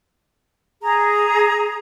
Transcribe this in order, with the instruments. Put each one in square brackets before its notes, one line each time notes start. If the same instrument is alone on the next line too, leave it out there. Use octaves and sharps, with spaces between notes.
[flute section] G#4 A#5